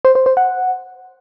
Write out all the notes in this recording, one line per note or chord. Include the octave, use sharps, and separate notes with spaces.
C5
C5
C5
F#5